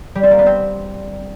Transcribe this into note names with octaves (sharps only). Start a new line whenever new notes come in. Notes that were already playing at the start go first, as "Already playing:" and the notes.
G3
C4
A#3
B3
C4